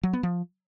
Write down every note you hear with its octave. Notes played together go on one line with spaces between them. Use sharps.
F#3
B3
F3